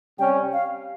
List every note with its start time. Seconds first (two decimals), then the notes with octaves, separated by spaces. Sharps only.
0.19 C3 G3 C#4 G5
0.53 F5